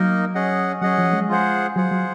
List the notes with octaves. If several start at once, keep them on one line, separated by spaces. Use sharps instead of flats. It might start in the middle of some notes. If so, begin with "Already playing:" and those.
Already playing: F#3 A#3 D#4 A#4 D#5
C#4 G#4 D#5 F#5
F#3 C#4 G#4 D#5 F#5
F3
G#3
F4 G#4 C5 F#5
F#3 F4 G#4 C5 F#5
F#3